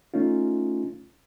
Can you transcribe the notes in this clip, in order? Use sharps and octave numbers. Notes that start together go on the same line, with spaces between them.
A3 C#4 D#4 F4